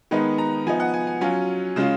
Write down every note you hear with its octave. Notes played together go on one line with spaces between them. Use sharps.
D#3 G#3 B3 D#4 B4
A#5
F3 B3 D#4 G#5
F#5
G#5
G#5
F#3 C#4 F4 G#5
C#3 G#3 C#4 F4